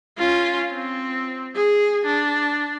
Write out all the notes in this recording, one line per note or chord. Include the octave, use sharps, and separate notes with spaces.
C#4 F4
C4
G#4
D4